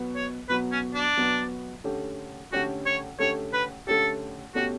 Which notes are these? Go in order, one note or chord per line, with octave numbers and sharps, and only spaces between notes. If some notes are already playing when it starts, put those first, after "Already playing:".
Already playing: B2 F#3 B3
C#5
B2 F#3 B3 B4
C#4
D4
B2 F#3 B3
D3 A3 C#4 G4
D3 A3 C#4 F#4 G4
C#5
D3 A3 C#4 G4 C#5
B4
D3 A3 C#4 G4 A4
B2 A3 C#4 F#4 G4